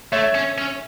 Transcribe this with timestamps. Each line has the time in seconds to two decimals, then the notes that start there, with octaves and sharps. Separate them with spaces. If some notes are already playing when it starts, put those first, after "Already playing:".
0.12 A3 C#5 E5
0.35 C#4
0.58 C#4